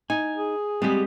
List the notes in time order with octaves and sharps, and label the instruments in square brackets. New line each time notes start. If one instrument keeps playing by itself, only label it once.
[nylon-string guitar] D#4 [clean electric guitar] G#5
[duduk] G#4
[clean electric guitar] G3 B3 G4 [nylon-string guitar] G#3 C4